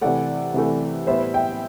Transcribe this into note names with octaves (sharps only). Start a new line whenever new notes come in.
C3 E3 A3 D5 F#5
C3 E3 A3
A2 G3 B3 C5 E5
E5 G5